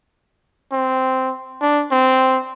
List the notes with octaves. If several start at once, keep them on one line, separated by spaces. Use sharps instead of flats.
C4
D4
C4